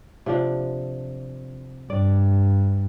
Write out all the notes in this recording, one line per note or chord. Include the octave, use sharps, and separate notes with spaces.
C3 F3 D4
G2 D5